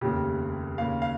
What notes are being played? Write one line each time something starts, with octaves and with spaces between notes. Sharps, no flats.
F1 D#2 C#3 G4
D#2 C#3 F5
F5